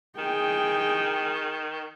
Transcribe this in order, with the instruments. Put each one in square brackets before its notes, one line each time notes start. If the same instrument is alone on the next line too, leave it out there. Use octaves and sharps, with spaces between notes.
[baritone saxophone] D#3 [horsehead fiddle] G#4 G5